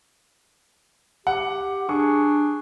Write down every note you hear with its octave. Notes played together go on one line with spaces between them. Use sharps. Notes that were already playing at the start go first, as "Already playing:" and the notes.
G4 F#5
D4 G#4 C#6